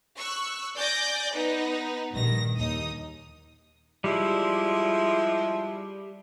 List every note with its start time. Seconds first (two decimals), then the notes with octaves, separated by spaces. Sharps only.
0.16 C#6 E6 F#6
0.76 D5 G#5 D6 G6 A6 A#6
1.33 B3 D#4 B4
2.13 A#1 G2 D#3 A#6
2.56 D#2 D#4 D#6
4.04 F3 G3 G#3 E4